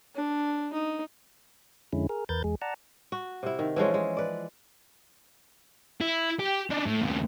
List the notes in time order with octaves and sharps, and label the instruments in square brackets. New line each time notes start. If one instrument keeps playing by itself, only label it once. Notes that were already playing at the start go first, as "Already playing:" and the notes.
[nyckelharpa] D4
D#4
[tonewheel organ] F2 D3 G#3 C#4 E4
G#4 A#4
E2 A#4 B4 G6 A6
E2 G#3 G#4
D5 F#5 A5 A#5
[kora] F#4
C3 E4
D#3
E3 F3 G#3 C#4
G#3
B4 D5
[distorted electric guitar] E4
G4
D4 D#4
A2
D#2 C#3